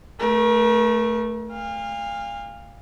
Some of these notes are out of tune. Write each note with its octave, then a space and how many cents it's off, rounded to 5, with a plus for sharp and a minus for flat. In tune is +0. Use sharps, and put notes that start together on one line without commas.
A3 +0 A#4 +40
F5 +0 G#5 -45